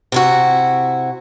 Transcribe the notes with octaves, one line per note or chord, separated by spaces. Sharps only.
C3 E4 F#4